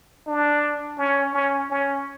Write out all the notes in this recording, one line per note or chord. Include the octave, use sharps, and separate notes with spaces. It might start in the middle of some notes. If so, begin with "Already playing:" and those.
D4
C#4
C#4
C#4